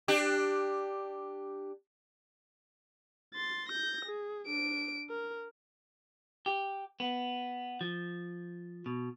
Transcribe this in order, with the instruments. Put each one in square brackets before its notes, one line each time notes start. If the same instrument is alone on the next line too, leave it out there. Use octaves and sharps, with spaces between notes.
[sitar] D4 G4
[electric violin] C6 A6
G6 A#6
G#4
D4 D7
A#4
[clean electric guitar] G4
B3
F3
B2